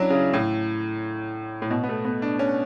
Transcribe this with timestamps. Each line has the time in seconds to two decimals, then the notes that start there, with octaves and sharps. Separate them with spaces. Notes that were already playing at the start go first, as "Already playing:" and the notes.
Already playing: F#3 C#4 D4 E4
0.10 C#3
0.33 A2
1.62 A2
1.71 B2
1.84 B3
1.89 A3
2.05 B3
2.22 D4
2.39 C#4